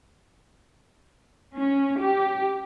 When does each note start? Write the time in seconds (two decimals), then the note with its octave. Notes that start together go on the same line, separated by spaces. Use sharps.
1.55 C#4
1.99 G4